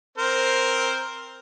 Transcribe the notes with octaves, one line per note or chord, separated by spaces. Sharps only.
C4 A#4 C5